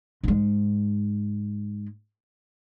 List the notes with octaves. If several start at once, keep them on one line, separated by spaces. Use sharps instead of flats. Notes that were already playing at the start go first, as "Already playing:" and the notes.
G#2 G#3